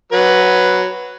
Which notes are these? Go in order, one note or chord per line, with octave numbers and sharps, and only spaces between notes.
F#3 B4